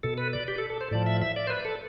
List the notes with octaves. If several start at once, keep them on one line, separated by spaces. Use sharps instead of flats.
B2 A4
B4
D5
G4
A4
A4
C5
A2 F3 D5
E5
E5
D5
C5
B4
A4